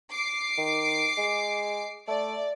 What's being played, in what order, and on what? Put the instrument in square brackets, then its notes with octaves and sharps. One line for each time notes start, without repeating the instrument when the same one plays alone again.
[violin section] D6 C7
[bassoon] D#3
G#3
[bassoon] A3 [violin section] D5